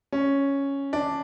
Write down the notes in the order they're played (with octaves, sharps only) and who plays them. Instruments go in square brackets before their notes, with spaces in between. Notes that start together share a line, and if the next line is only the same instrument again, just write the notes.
[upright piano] C#4
D4